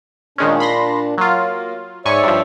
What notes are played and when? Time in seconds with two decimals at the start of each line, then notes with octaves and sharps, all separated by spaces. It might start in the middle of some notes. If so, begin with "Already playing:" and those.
0.38 A#2 D#3 G#3 C#4 D4
0.60 B5 C6 A#6
1.18 F#3 A#3 F4
2.06 G#2 C#5 D5 E5 G#5 C#6
2.24 G2 F3